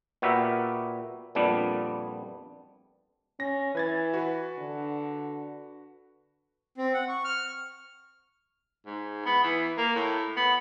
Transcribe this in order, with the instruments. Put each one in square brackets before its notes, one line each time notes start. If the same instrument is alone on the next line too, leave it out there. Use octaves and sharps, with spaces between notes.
[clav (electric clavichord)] A#2 B3 F#4 G4 A#4 E5
F2 A#2 G3 B3 D4
[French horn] C#4 [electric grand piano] A#6
[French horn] E3 [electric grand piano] B4 G#6 A6
[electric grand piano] F#4 B4
[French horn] D3
[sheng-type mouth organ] C4
F#5
C#6
F6
[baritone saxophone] G#2
B3
E3
A#3
A2
B3